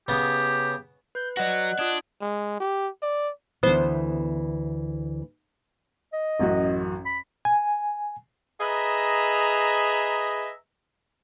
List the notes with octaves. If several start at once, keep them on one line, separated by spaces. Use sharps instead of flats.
C#3 B3 G4
B4 G6
F#3 F#4 D5 D#5 F#5 F#6
D4 F4 D#6 G#6
G#3
G4
D5
D2 E3 B3 C5
D#5
A1 F#2 F#4
B5
G#5
G#4 B4 D#5 E5 A#5